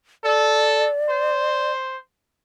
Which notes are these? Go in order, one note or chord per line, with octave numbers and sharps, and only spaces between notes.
A4 D5
C5